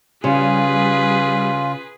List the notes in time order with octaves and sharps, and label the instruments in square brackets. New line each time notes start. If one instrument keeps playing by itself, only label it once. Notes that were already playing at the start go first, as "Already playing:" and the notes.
[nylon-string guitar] C#3 [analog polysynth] G3 [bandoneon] F4 [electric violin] G#4 B4